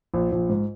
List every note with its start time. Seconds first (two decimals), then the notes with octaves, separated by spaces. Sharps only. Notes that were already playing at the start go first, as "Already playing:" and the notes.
0.14 A#1
0.32 A#1
0.49 G#2